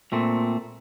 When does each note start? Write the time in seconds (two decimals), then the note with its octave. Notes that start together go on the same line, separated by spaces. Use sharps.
0.12 A#2 A3 C4